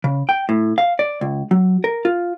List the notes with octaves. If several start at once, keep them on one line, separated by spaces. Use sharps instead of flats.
C#3
G5
A2
F5
D5
C#2
F#3
A#4
F4